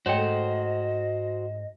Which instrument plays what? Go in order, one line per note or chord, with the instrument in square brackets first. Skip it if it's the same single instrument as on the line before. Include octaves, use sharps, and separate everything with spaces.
[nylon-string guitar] G#2 A3 [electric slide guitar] F#4 C5 [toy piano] C#5 G5 [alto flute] D#5